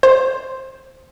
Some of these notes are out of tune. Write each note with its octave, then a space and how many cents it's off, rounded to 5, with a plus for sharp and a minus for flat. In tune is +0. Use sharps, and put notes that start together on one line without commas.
C5 +5